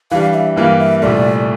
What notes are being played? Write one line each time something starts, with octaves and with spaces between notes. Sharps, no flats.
E3 G3 D4 F5
E5
G2 E3 A#3 F5
E5
C2 A#2 A3 D5